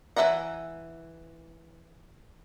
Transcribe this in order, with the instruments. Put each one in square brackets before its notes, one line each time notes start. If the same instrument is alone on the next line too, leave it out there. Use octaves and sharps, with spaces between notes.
[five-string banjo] E3 C5 E5 F#5 A#5